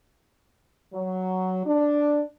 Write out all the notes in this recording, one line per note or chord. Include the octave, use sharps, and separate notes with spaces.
F#3
D4